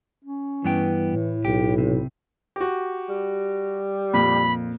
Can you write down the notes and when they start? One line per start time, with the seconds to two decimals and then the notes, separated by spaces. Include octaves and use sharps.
0.24 C#4
0.64 G2 E3 B3 G5
1.11 A2
1.45 B1 G4
1.78 C3
2.56 F#4 G4
3.10 G3
4.13 F2 A#2 B5